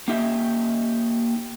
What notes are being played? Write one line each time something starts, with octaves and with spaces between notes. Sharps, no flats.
A#3 C#4 D#4 G4 E5